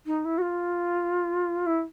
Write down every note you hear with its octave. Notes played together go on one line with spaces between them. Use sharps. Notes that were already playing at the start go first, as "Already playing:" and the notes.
D#4
E4
F#4
F4
E4